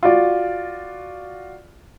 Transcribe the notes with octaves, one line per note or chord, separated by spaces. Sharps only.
F4 F#4 D5